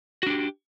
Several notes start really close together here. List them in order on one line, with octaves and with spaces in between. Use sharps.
F#4 D4 G4